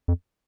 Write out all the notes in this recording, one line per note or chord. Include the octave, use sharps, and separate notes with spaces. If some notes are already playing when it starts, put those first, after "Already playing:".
F2